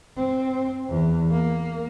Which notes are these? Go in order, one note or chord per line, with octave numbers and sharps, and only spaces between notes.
C4
E2
A#3